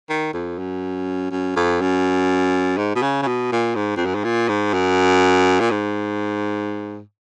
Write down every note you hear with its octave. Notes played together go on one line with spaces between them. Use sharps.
D#3
F2
F#2
F#2
F2
F#2
G#2
B2
C#3
C#3
B2
A#2
G#2
F2
F#2
G#2
A#2
G#2
F#2
A#2
G#2